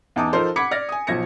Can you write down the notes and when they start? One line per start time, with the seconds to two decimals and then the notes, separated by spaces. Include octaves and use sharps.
0.16 E2 D#4 A5 D6 D#6
0.33 F3 D#4 A4 A#4 C5
0.56 F#5 B5 D6 G#6 B6 C#7
0.71 D5 F6 A#6
0.89 G#5 D#6
1.07 B1 F3 G#6 A#6 C#7